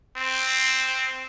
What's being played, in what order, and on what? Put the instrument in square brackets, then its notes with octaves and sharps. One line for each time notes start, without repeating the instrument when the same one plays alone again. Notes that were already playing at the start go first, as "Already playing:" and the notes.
[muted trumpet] C4